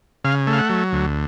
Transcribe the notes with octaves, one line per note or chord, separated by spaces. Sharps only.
C#3 F5
A3
F5
F#5
F#3
D2